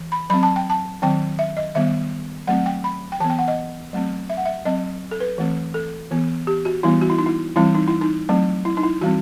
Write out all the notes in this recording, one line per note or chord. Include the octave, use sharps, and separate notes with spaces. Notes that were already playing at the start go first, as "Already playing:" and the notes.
Already playing: E3
B5
F#3 C4 B5
A5
G5
A5
D#3 F#3 C4 G5
E5
D#5
D#3 G3 B3 E5
F#3 A3 C4 F#5
G5
B5
G5
E3 B3 A5
G5
F#5
D#5
F#3 A3 C4
E5
F#5
E5
F#3 C4 D#5
A4
B4
E3 A3 C4
A4
E3 B3
G4
F#4
E3 G3 B3 E4
F#4
E4
D#4
E4
E3 G3 C4 E4
D#4
E4
D#4
F#3 A3 C4
E4
D#4
E4
E3 G3 C4 F#4